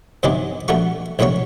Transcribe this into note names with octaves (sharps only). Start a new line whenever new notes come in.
G2 C3 E3 F#3 D#4 G4
A#1 G3 A3 F#4 C#6
A#1 A2 F#3 G3 C#5 C#6